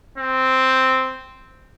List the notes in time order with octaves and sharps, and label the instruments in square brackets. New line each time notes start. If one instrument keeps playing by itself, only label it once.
[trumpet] C4